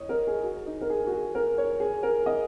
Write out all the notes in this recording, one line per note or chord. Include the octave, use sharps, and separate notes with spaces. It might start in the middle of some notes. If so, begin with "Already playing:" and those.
Already playing: C#5 D#5
A#4
G#4
F#4
D#4
A#4
G#4
F#4
G#4
A#4
C#5
G#4
A#4
D#5